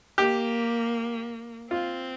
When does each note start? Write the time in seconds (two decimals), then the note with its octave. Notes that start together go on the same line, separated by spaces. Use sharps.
0.18 A#3 G4
1.70 C4 F4